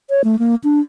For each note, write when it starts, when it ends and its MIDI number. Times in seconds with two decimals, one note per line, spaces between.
0.10 0.22 73
0.24 0.39 57
0.39 0.55 58
0.64 0.80 62